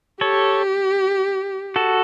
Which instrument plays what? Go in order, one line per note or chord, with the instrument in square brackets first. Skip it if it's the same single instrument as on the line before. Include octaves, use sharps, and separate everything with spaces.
[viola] G4 [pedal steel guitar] A4 C#5
[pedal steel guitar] F#4 A4